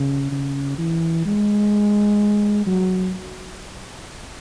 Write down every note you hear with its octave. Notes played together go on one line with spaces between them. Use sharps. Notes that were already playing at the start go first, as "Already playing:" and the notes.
Already playing: C#3
C#3
E3
G#3
F#3